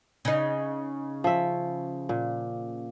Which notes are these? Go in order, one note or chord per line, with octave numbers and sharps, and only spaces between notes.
C#3 D#4
F3 E5
A#2